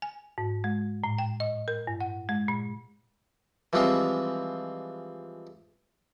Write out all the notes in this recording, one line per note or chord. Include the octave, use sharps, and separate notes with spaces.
G#5
G#2
G#3
A2
G5
D#5
A#4
G2
F#5
G#3
A#2
E3 F3 G3 G#3 C4 F4